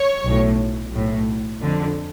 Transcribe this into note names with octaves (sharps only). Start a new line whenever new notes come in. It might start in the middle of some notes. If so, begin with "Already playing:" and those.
Already playing: C#5
B1 A2
B1 A2
F2 D3